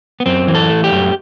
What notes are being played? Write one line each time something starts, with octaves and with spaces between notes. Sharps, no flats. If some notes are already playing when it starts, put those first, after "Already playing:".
B3
F#2 C4
E3
A4
A3
G4
F#2